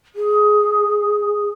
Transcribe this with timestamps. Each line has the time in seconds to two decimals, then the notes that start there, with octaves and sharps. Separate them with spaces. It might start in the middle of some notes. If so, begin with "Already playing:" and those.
0.15 G#4